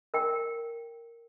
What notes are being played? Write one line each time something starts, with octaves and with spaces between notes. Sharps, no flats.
A#4 G5